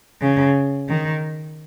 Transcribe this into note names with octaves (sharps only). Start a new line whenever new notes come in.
C#3
D#3